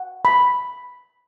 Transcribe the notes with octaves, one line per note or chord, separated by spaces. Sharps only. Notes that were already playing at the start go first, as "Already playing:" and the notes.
Already playing: F#5
B5